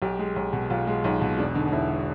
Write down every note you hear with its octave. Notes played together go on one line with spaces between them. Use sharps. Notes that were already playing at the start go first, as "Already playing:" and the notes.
B1 G4
G#3
B1
B2
B1 F4
G#3
B1 D#4
B2
E1 D4
D3 D#4
D#4
E1 E4